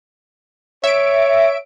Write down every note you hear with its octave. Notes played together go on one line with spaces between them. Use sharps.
C#5 E5 D7